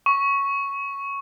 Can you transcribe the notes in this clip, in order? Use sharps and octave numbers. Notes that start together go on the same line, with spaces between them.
C#6